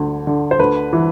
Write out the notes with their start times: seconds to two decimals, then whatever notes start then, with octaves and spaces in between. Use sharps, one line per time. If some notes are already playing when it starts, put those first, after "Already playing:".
Already playing: D2 D3
0.27 D3
0.51 C5
0.59 D2 B4
0.93 E3